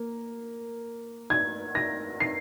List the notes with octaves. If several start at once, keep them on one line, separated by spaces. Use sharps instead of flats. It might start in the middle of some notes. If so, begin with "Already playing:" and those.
Already playing: A#3
G#6
A#6
C7